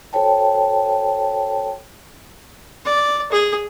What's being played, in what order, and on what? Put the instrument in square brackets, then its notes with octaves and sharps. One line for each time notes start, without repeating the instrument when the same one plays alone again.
[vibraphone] F#4 A4 C5 C#5 G5 A5
[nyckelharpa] D5
G#4